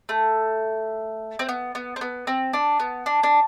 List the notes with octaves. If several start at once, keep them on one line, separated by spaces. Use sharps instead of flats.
A3
C4
B3
B3
C4
B3
C4
D4
B3
D4
D4